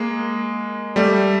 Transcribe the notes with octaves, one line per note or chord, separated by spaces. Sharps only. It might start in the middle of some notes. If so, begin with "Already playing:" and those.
Already playing: G#3 A#3
G3 A3